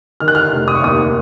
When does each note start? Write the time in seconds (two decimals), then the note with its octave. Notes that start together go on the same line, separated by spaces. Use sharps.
0.20 D#3 F6
0.28 F#6
0.35 F6
0.52 F1
0.68 D#6
0.75 C#6
0.83 D#2 D#6